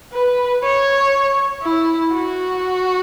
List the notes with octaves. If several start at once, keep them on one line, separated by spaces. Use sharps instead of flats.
B4
C#5
E4
F#4